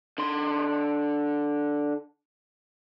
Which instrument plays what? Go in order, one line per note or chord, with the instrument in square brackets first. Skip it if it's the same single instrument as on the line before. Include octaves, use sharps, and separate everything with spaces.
[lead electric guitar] D3 C6